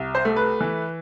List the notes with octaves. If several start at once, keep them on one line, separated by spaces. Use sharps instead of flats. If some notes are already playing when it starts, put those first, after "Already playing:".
Already playing: C2
C5
A3
B4
E3